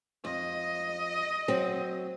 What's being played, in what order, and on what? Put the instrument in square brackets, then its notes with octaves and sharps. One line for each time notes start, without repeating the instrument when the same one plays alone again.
[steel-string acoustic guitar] F2 [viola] D#5
[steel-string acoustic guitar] F#3 C4